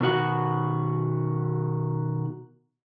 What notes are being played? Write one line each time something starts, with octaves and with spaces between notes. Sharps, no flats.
B2 D#3 F#4 F#5